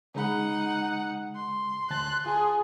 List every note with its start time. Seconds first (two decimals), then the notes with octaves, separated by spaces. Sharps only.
0.15 C#3 G#3 D#4 F#5 B5
1.35 C6
1.90 D2 A5 F#6 A6
2.26 F4 G#4 A5 D#6